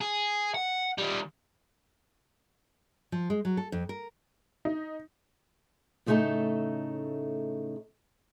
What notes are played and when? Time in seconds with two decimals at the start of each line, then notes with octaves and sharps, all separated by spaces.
0.01 G#4
0.54 F#5
0.98 D#3 G3
3.12 F3
3.30 G#3
3.45 F#3
3.57 A4
3.72 F2
3.89 A#4
4.65 D#4
6.06 A2 C#3 A3 D#4 A4 A5